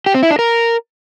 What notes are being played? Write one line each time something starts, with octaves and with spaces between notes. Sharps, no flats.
G4
C4
E4
D4
A#4